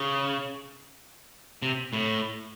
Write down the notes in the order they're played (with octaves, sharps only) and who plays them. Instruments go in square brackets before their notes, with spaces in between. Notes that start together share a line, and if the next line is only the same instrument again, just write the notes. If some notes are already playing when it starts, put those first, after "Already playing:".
Already playing: [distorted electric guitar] C#3
C3
A2